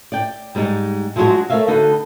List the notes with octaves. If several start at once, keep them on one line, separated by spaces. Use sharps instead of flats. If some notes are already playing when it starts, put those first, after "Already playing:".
D5 G5
G#2 G3 G#3 D4 D#4
F3 F#3 G#3 D4 F#4 G#4
A3 A#4 C#5 E5 F5
D3 D#4 F#4 A4 B4